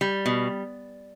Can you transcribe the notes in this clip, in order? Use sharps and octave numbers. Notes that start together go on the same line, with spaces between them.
G3
B2